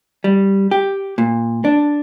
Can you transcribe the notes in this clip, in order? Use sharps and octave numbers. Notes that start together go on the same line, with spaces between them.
G3
G4
A#2
D4